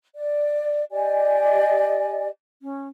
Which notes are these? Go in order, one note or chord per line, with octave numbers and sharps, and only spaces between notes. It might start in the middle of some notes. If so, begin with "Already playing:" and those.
D5
G4 D5 D#5 G#5
C#4